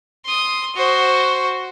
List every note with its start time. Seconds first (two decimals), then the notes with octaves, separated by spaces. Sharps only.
0.25 C6 D#6
0.76 F#4 C5